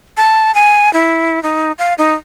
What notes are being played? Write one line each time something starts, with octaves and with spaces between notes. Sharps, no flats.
A5
G#5
E4
D#4
F5
D#4